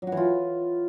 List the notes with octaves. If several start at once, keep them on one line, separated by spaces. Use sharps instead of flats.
F#3
F#4
E3
F4